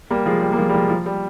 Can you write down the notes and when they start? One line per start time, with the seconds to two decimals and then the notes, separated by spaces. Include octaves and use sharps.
0.10 G3 A#3
0.26 F3 G#3
0.42 G3
0.53 A#3
0.57 F3 G#3
0.69 G3
0.74 F3 G#3
0.90 F3
1.06 G3